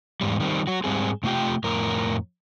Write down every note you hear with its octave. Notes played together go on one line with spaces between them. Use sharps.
E2 G#2 G3
D#3 G3 B3 C4
F#3 F#4
G#2 G3 C4 G#4
C3 A3 F4 G4 G5
F2 A2 A#4